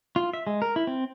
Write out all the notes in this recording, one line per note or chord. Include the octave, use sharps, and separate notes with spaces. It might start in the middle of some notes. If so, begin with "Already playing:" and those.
F4
E5
G#3
A#4
E4
C4